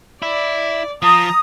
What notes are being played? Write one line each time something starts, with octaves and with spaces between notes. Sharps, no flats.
E4 D5
F3 A#5 D#6